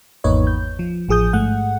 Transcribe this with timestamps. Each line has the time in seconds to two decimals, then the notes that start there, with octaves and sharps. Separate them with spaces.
0.24 G#1 E2 A#3 D#4 B4 C#5
0.47 G6
0.79 F3
1.09 A1 F3 G#4 D#6 G6
1.33 G#2 A3 F#5